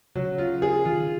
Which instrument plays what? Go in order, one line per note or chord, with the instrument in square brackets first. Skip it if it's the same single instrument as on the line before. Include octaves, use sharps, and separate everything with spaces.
[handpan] C#3 [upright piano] F#3
[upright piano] F4
G#4
[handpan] D#3 [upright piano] F4